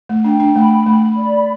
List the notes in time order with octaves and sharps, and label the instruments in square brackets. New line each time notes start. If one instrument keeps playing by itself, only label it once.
[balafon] A3
[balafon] D4 [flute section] G5
[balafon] D4
[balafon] A3 [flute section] B5
[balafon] A3 [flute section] B5
[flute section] D5